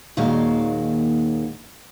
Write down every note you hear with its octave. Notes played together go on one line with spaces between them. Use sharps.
D#2 A#2 D#3 G#3 F#4 F5